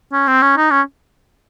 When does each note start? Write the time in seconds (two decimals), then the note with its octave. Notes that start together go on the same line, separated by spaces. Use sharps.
0.13 C#4
0.28 C4
0.42 C#4
0.57 D#4
0.71 C#4